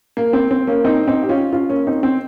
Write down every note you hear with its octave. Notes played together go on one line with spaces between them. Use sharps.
A#3
C4
C4
A#3 C#4
C4 D#4
C4 D#4
G4
C#4 F4
C#4 F4
A#3 C#4
C4 D#4
C4